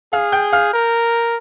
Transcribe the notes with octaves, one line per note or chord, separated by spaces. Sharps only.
G#4 F5 F6
G5 G6
F5 F6
A#4